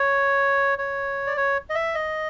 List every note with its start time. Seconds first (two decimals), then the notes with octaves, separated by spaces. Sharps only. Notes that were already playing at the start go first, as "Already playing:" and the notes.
Already playing: C#5
0.78 C#5
1.27 D5
1.37 C#5
1.70 D#5
1.75 E5
1.95 D#5